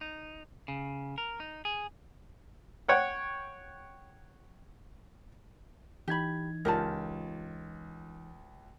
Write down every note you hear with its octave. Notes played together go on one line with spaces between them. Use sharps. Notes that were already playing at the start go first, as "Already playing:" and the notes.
D#4
C#3
A#4
D#4
G#4
C#5 F#5 G5
E3 D#4 G4 B5 G#6
C#2 F4 G4 A#4 A5